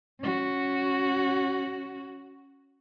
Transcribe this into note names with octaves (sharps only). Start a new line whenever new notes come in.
C#4 F#4